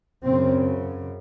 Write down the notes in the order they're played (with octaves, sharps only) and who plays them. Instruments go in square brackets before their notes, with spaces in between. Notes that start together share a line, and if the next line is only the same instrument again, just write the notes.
[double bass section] F#2 C#3 C4